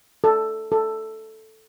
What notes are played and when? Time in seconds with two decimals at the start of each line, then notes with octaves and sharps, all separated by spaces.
0.24 A4
0.72 A4